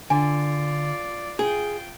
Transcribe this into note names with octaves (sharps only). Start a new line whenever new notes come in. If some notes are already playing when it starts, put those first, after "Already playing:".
D3 F4 D5 G#5
F4 G#4 G5